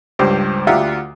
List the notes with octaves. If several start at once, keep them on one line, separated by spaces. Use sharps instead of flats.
C#2 G2 G4 C5
D2 F4 G4 E5 F#5 A#5